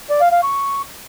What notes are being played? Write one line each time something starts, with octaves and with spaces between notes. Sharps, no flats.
D5
F5
F5
C#6